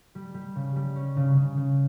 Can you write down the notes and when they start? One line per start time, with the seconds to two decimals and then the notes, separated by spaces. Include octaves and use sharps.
0.15 G3
0.34 G3
0.56 C#3
0.76 G3
0.96 C#4
1.17 C#3
1.37 C#3
1.57 C#3